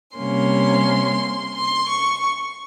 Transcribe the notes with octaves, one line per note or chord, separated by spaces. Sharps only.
C3 G3 A#3 C#4 C6
C6
C#6